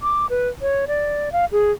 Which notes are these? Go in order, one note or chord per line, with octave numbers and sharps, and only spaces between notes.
D6
B4
C#5
D5
F5
G#4